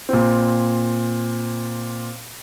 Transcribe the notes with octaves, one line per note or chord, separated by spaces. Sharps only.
A#2 C4